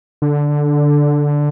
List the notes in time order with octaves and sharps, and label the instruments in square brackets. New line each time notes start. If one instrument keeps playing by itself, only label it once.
[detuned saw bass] D3